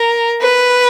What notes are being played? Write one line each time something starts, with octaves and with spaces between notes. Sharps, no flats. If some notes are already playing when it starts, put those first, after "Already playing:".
Already playing: A#4
B4